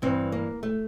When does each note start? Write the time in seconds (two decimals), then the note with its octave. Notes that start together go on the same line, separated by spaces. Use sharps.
0.02 G2 E3 C4
0.32 A#3
0.63 A3